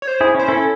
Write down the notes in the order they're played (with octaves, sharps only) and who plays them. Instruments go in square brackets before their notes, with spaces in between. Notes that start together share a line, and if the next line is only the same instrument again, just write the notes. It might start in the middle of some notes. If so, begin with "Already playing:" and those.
[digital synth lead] C#5
C5
[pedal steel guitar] E4 G#4
C#4 E4
[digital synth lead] C5
[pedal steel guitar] C#4 E4 [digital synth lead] A4